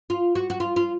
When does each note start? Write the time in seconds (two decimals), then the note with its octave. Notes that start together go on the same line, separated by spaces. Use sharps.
0.10 F4
0.35 F#4
0.50 F#4
0.60 F4
0.76 F4